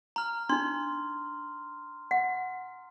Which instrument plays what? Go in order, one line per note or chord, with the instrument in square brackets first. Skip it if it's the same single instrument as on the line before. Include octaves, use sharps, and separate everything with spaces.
[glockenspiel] A#5 F6
[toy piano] D4 D#4 [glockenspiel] C6
[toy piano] F#5